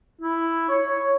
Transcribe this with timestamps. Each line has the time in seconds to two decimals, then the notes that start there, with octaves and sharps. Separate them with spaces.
0.22 E4
0.69 C#5